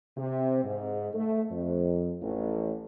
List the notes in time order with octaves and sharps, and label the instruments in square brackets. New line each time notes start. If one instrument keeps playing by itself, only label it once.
[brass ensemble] C3
G#2
A3
F2
A1